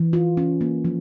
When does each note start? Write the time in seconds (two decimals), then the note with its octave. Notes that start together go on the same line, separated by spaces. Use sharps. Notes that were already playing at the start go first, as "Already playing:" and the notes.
Already playing: E3
0.13 F4
0.37 C#4
0.61 A#3
0.85 F3